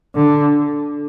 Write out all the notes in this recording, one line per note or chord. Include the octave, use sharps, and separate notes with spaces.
D3